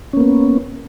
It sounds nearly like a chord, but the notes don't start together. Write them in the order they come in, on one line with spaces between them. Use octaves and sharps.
C#4 A#3 B3